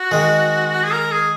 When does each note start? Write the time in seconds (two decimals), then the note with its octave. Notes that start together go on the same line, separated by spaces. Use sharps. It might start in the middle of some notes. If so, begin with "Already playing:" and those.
Already playing: F#4
0.11 D#3 G#3
0.83 G#4
0.93 A#4
1.12 G#4